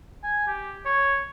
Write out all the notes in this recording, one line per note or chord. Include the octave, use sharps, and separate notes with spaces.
G#5
G4
C#5